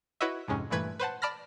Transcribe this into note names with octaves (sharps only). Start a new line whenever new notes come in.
E4 F#4 B4 C#5 D#5 E5
F2 G#2 C3 G#3 C#4
G2 A#2 E3 A3 B4 G#6
B4 C5 F#5 A5
D5 A5 B5 F6 A#6